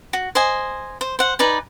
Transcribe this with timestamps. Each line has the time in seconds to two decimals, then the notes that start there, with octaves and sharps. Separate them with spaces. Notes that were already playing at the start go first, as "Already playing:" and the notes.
0.13 F#4
0.35 C5 D#5 G#5
1.01 C5
1.19 C5 F#5
1.39 D#4 B4 D5 G#5